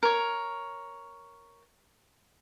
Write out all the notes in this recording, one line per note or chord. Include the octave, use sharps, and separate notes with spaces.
A#4 C#5